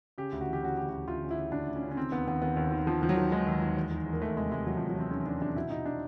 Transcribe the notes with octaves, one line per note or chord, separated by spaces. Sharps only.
C#3 G4
D2
F#4
E3
G4
C#3 F#4
D2 G4
D2 F#4
D2 F4
C#3
E4
C#3
D2 D4
D2
C#4
C#3
C#4
D#3 C4
D#2 B3
D#2 B3
D#2 B3
D#2
D#3
D#3 F3
D#3 F3
F#3
D#3
D#3 G#3
D#2
D#2
E2
D#3
E2
A#3
E2 A3
C3 G#3
C3 G#3
E2 F#3
F3
E2
F#3
E2 C4
D#3 C#4
E2 D4
C3 D4
B2 E4
B2 D#4
D4